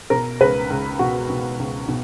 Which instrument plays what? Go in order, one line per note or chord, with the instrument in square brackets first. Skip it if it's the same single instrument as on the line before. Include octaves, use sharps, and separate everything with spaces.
[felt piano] B2 A#4
C#2 B4
C#2
B2 F#4
B2
C#2
B2